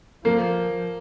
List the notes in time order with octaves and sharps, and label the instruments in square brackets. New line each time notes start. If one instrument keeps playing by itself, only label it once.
[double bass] F3 [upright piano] A#3